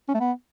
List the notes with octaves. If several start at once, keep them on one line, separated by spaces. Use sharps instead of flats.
C#4
A3
B3